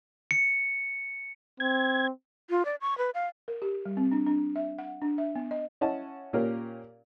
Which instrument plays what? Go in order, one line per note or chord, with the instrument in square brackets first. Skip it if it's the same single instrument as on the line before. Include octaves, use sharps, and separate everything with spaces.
[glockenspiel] C#7
[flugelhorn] C4 [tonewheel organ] G#6
[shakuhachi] F4
D5
C#6
B4
F5
[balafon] A#4
G4
G3
C4
D4
D4
E5
F#5
D4
E5
B3
D#5
[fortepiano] C#4 E4 D#5 F#5 A5
A#2 A#3 C#4 G4 A#4